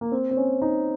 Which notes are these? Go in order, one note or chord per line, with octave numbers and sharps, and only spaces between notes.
A#3
C4
C4
C#4
D#4